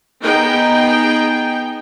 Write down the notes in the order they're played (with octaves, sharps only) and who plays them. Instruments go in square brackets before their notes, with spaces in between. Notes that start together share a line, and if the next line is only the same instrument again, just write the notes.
[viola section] B3 D#4 G#4 G5